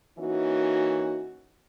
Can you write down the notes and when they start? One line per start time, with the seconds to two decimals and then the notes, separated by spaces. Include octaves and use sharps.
0.19 E3 A#3 C#4 D#4 F#4